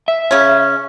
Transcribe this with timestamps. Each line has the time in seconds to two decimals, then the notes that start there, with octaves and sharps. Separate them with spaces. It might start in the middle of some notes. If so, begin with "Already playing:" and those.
0.08 E5
0.31 C#3 C#4